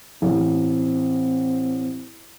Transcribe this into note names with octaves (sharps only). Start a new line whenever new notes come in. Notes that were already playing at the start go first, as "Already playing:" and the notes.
A1 C4